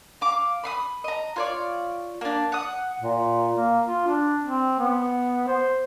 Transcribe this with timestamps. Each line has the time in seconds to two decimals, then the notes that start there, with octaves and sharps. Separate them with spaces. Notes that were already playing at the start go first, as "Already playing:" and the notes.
0.21 F5 D6
0.63 B5 C6 D#6
1.04 D#5 A#5
1.36 F4 C#5 D5
2.21 A#3 D4
2.52 F#5 D#6
3.01 A#2
3.55 A#3
3.86 F4
4.07 D4
4.43 C4
4.79 B3
5.47 C5